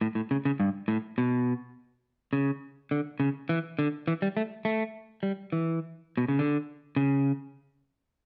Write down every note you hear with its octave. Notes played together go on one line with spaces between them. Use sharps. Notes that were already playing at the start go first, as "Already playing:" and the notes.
A2
A2
C#3
C#3
G2
A2
B2
C#3
D3
C#3
E3
D3
E3
G3
A3
A3
G3
E3
B2
C#3
D3
C#3